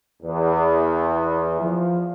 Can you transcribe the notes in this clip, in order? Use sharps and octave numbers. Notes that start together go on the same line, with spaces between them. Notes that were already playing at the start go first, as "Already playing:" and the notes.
E2
F3